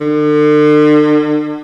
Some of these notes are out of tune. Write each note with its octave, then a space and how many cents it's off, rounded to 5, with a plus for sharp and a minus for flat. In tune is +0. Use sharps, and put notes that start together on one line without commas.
D3 +40